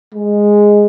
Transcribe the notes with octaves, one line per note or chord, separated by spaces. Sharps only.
G#3